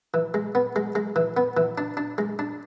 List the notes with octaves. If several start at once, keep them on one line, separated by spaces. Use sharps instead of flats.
E3
G#3
B3
G#3
G#3
E3
B3
E3
D4
D4
G#3
D4